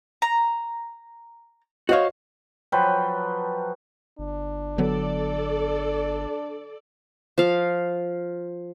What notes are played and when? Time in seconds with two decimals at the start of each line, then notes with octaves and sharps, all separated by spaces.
0.22 A#5
1.89 F#4 C5 C#5 D#5 F5
2.72 F3 F#3 B4 G5
4.19 G1 D4
4.78 D3 F#3 B3 A4 D5
7.38 F3 F5